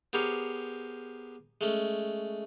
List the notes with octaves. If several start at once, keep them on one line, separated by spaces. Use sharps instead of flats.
B3 G4 G#4 A#4 C5 C#5
G#3 A3 C#4